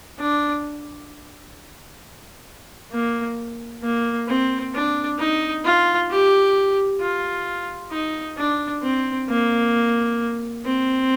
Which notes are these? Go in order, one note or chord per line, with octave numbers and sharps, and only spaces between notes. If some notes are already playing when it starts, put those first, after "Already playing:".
D4
A#3
A#3
C4
D4
D#4
F4
G4
F4
D#4
D4
C4
A#3
C4